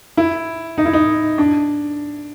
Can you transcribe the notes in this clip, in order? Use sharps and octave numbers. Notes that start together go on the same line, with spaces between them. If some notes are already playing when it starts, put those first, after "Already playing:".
E4
D#4
E4
D#4
D4